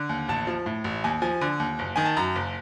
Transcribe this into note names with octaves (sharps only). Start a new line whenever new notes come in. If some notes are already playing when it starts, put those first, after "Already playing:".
Already playing: D3
D#2
A1 A5
F3
A2
A1
D#2 G#5
F3 G#5
D3
D#2
F#1
D#3 G#5
A5
F#2 A#5
F#1